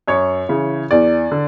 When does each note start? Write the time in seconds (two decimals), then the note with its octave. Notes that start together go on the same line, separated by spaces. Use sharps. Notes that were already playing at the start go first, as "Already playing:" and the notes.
0.08 F#2 C#5
0.49 C#3 E3
0.91 E2 D5
1.32 D3